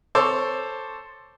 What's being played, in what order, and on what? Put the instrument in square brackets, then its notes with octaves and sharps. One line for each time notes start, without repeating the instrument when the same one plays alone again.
[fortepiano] A4 C5 C#5 D6 E6